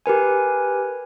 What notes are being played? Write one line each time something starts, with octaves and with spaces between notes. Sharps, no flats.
G4 A#4 B4 G#5